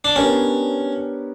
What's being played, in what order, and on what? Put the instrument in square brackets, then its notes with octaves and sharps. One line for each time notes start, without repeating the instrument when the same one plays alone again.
[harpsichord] D4
[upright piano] B3 D4 G4 A#4 C#5 [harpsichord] C#4